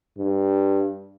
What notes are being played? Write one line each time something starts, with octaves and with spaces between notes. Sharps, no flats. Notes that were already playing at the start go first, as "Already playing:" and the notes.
G2